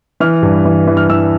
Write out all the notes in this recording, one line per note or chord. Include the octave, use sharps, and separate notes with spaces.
E3 F6
G2
E3
E3
F6
E3 E6